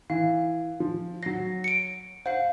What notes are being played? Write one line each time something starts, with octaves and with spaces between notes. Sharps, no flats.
E3 F5
F3
F#3 A#6 C7
C#7 D7
C5 F5 F#5